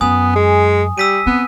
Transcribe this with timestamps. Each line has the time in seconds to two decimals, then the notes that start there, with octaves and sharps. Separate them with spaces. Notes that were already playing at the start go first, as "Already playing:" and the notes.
0.01 F#2 B3 G#5 D#6
0.35 G#3
0.98 G3 E6 B6 D#7
1.26 B3 C4